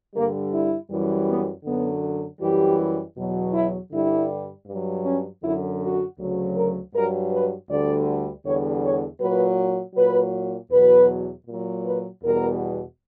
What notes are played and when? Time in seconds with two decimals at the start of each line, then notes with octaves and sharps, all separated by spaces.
0.14 G2 D3 G3 A#3
0.52 E4
0.89 F#2 E3 G3
1.27 B3
1.64 F#2 D3 F#3 B3
2.40 F#2 E3 G3 G4
3.16 E2 B2 F#3
3.54 E4
3.91 G2 D3 G3 E4
4.66 G2
4.71 F#3
5.04 C#4
5.41 F#2 D3 F#3 E4
5.79 F#4
6.18 D2 C#3 F#3
6.55 A#4
6.93 G2 F#3 A#4
7.31 B4
7.68 D2 D3 G3 D5
8.43 E2 D3 G3 C#5
8.82 C#5
9.19 A#2 F#3 B4
9.94 A#2 F#3 B4
10.70 E2 B2 F#3 B4
11.45 A#2 F#3
11.84 B4
12.21 E2 B2 G3 A#4